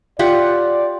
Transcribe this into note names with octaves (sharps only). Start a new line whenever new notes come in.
F4 G4 D5 F#5